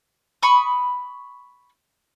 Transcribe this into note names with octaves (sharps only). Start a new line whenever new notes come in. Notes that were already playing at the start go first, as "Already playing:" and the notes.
B5 C#6 D#6